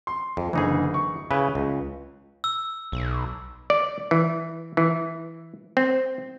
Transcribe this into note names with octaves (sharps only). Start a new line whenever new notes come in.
C6
F2
F#1 D3 E3 D#4 G#4
C#6
C#3 E4 B4
C#2
E6
B1
D5
E3
E3
C4